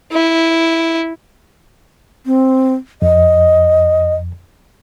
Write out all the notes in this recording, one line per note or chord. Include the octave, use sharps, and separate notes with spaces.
E4
C4
F2 D#5